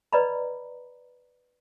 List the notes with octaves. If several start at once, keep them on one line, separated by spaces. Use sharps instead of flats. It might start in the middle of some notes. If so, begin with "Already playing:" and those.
B4 D5 D#5 A#5 B5